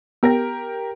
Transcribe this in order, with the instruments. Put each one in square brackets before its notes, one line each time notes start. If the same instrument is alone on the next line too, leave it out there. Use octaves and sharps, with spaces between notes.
[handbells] B3 G5 A#6 [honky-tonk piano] G4 A#4